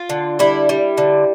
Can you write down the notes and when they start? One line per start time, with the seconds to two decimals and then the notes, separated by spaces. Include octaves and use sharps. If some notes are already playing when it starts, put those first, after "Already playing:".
Already playing: F4
0.10 D3
0.39 G3 E4
0.69 G3
0.97 D3